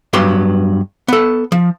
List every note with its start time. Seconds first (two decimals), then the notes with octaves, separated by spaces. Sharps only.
0.13 G2 F#3 B3 C6
1.08 B3 A4
1.52 F3